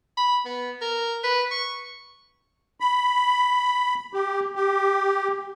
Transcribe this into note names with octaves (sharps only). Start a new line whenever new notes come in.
B5
B3
A#4
B4
C#6
B5
G4
G4